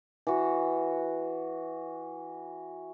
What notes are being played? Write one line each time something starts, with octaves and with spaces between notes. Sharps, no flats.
E3 F#4